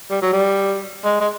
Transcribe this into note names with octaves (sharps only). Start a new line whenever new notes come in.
G3
F#3
G3
G#3
G#3